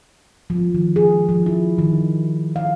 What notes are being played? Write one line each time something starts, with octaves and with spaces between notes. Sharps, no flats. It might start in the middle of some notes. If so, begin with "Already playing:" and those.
F3
D#3
G#4
F3
E4
D#3
F5